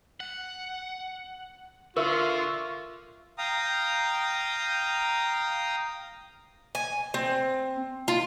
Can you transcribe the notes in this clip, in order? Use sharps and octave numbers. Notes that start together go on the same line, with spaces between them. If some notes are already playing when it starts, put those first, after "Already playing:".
F#5
D3 F4 A#4 E5 C#6 E6
F5 G5 A#5 D#6
G#5
C4
F4